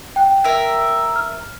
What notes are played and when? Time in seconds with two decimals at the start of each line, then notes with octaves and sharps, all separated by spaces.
0.16 G5 F#6
0.44 A#4 E5
1.16 F6